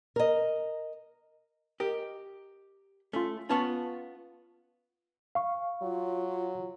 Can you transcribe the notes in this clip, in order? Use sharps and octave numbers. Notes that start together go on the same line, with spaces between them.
A#4 D#5
G4 A#4 D#5
A3 C#4 F4
B3 C#4 F4 A5 C#6
F5 C#6
F#3 F4